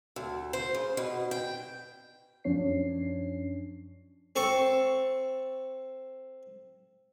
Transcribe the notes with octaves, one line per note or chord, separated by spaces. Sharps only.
D2
C5
C#3
B2
G5
F#2 F3 C#4 D4 C#5 C7
C4 A4 C#6